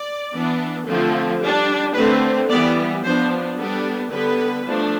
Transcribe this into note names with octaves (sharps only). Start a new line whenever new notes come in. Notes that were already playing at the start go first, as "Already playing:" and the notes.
Already playing: D5
E3 B3 D4
D3 F3 A3 C4
G3 D4
D3 A3 C4 B4
E3 G3 B3 D5
F3 B3 D4 C5
G3 B3 D4 A4
D3 G3 B3 B4
F3 A3 D4